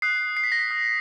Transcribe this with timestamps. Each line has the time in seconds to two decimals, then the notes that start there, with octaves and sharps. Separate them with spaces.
0.02 D#6 F#6 C7
0.37 C7
0.44 B6
0.52 A#6
0.59 B6
0.71 D#6 F#6